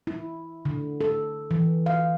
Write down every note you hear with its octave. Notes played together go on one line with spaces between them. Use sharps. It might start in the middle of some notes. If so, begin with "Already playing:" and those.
E4
D3
A4
E3
F5